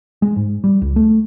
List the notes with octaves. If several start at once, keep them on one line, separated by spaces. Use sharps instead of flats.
G#3
G#2
G3
C#2
A3